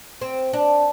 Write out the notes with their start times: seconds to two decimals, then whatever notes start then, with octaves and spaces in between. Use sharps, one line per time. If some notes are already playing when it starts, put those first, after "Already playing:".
0.21 C4
0.53 D4